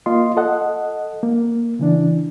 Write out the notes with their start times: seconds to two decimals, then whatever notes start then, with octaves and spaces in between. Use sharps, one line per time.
0.06 A#3 F4 D#5 C6
0.37 A4 D#5 F#5
1.23 A#3
1.79 C#3 E3 D4